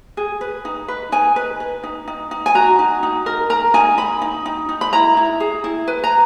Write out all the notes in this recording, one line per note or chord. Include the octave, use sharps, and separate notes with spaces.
G#4
B4
D#4
B4
D#4 G#5
B4
B4
D#4
D#4
D#4
G#5
F#4 A#5
D#4
D#4
A#4
A#4 A#5
D#4 G#5
D#4 B5
D#4
D#4
D#4
B5
E4 A#5
E4
G#4
E4
B4
A#5